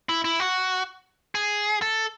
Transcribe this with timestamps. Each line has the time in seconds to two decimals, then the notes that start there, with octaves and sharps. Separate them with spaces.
0.09 E4
0.24 E4
0.40 F#4
1.35 G#4
1.82 A4